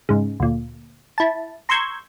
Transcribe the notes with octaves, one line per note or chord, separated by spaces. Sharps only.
G#2 C#3
D2 A#2
E4 A5
A#5 C6 C#6 E6 G6 G#6